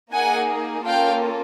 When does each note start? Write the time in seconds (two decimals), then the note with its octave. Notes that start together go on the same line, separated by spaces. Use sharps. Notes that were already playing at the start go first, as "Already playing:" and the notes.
0.13 A#3 D#4 G#4 F#5 G#5
0.86 A#3 C#4 F4 A4 F5 G5